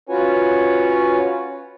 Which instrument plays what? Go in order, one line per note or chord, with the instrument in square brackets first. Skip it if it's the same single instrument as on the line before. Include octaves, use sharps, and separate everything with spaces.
[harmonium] C#4 F4 F#4 B4 C#5 G#5